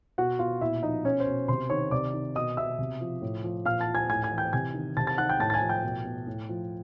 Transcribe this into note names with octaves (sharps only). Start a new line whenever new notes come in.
B2 F#4 F#5
B2 F4 F5
A#2 E4 E5
F3 D#4 D#5
B2 C#4 C#5
C5
B2
C3 C5 C6
D#3 C#5 C#6
C3 D5 D6
D#3
B2 D#5 D#6
B2 E5 E6
C3
F3
A2
F3
A#2 F5 F6
A5 A6
F3
G#5 G#6
A2 G#5 G#6
G#5 G#6
E3
G5 G6
C3 G#5 G#6
D#3
C3 A5 A6
A5 A6
D#3 F#5 F#6
G5 G6
A2 A5 A6
A6
G#5 G#6
F3
G5 G6
B2
B2
A2
F3